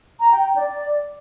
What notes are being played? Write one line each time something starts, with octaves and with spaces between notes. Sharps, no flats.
A#5
G5
G5
D5